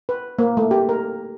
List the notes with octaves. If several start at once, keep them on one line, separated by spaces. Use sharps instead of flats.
B4
A#3
A3
G4
A#4